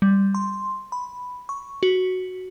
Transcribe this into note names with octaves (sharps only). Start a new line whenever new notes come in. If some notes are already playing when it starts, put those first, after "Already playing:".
G3
C6
B5
C#6
F#4